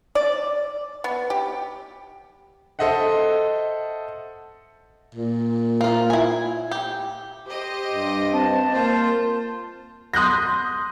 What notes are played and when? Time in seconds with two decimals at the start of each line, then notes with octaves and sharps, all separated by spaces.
0.15 D5
1.04 B3
1.30 G4
2.79 A4 C5 D#5 E5 F#5
5.15 A#2
5.81 A#3 F4
6.10 E4 G#5
6.71 G4
7.48 G4 C5 D#5
7.92 G2
8.33 C4 A5
8.73 A#3 F4 C5
10.14 C6 D#6 F#6 G6 A#6